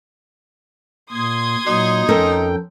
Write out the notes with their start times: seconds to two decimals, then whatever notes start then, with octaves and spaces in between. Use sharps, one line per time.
1.12 A#2 C6 D#6 G#6
1.67 A#2 F#3 D#4
2.09 F2 C#4 A4 A#4 G5